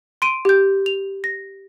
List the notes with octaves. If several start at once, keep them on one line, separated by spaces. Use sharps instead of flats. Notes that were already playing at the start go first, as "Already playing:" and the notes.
C6 D7 D#7
G4 G6
F7
A#6